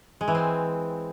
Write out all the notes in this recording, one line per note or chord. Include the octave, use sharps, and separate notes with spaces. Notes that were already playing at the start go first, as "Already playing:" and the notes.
G#3
E3
C4